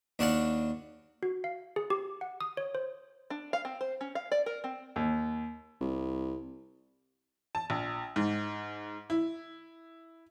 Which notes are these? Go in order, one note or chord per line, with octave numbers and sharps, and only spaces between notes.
D#2 D4 F#4 F5 F#5 A5
F#4
F5
G#4
G4
F#5
D#6
C#5
C5
D4
F5
C4
C5
C#4
F5
D5
A#4
C4
D#2
C2
A5
A#1
G#2
E4